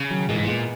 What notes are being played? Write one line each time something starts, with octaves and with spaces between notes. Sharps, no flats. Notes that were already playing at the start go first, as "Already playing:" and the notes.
Already playing: C#3
D#3 F#3
A#2 E3 G#3
G#2
A#2 G#3 B3